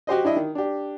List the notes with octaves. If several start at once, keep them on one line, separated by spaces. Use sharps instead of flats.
F#4 G4 C5 D#5
D4 E4 D#5 E5
D#3
D4 G4